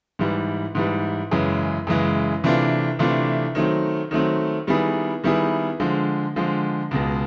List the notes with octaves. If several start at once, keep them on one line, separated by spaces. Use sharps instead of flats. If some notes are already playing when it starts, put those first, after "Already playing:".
G#2 E3 G3
G#2 E3 G3
F#2 C#3 E3 G#3
F#2 C#3 E3 G#3
C3 E3 A3 D4 F4
C3 E3 A3 D4 F4
D#3 F#3 A3 C4
D#3 F#3 A3 C4
D#3 G3 B3 E4 G#4
D#3 G3 B3 E4 G#4
D3 F3 G#3
D3 F3 G#3
C#2 B2 G#3